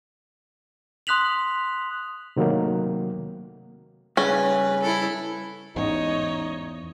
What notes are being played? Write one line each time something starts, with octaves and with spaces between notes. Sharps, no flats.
C6 D#6 F#6 B6 F7 F#7
C3 D#3 F#3 A3 A#3
G2 C#3 C#4 G#4 B4
E4 A4
A1 E2 G#2 D#4 C#5 D#5